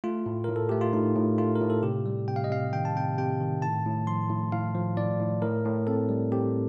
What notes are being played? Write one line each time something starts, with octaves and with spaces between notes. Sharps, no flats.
A3 F4
A2
A2 A#4
A4
A3 G4
F4
A2 D#4
A2
A3 F4
A#4
A2
A4
C3 G4
G3
C3 G5
F5
D#5
C3 F5
D#3 G5
A5
C3 G5
C3 G5
D#3
A2 A5
A2
F3 C6
A2
A2 F5
F3
A2 D5
A2
A2 A#4
A2
C4 A4
G3
C4 G4